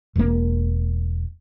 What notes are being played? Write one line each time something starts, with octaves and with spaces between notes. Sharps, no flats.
E1 A#3